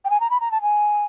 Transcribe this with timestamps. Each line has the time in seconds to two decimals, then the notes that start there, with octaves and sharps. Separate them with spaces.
0.04 G5
0.10 G#5
0.20 A#5
0.30 B5
0.40 A#5
0.51 A5
0.61 G#5